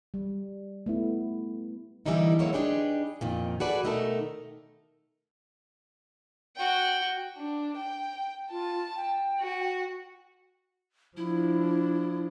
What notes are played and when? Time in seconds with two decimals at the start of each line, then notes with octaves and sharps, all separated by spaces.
0.14 G3
0.86 A3 B3 E4
2.06 D3 E3 G3 A#3 D#4 E4
2.39 F#3 G#3 A#3 B3 E4 C#5
2.53 D4 D#4 G4 G#4 B4
3.21 F2 A#2 D#3
3.60 F#4 G#4 A4 B4 D5
3.83 B2 D#3 A3 D#4 A#4 A5
6.56 F#4 G5
7.38 D4
7.77 G5
8.50 F4 A5
8.96 G5
9.41 F#4
11.17 F3 D4 E4